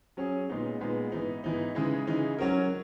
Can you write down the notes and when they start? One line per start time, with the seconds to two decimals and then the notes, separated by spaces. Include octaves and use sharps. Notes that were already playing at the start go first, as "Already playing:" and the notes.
0.17 F#3 C#4 G#4
0.49 A#2 G#3 B3 D#4
0.81 A#2 G#3 B3 D#4
1.12 G#2 E3 B3 D#4
1.44 G#2 E3 B3 D#4
1.75 C#3 E3 G#3 D#4
2.07 C#3 E3 G#3 D#4
2.38 F#3 C#4 F#4 A#4